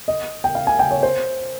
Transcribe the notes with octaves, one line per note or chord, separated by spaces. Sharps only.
D#5
G5
F5
G#5
G5
C#5
C5